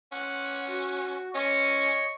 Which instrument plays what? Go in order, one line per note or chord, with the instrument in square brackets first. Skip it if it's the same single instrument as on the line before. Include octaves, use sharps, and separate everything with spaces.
[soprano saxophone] C#4 [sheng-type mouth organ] F#5
[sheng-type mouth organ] F#4
[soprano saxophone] C#4 [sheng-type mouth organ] C#5 D#5 [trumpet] C#6